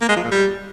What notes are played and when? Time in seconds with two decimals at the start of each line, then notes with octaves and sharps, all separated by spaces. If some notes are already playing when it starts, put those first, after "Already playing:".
0.01 A#3
0.09 G#3
0.16 F3
0.24 A#2
0.32 G3